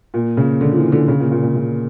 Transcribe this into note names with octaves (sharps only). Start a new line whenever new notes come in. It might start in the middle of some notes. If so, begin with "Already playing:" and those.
A#2
C#3
D3
F3
E3
D3
C#3
A#2
A#2
C#3
C#3